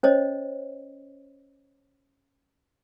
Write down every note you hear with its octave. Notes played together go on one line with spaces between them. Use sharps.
C#4 C5 C#5 D#5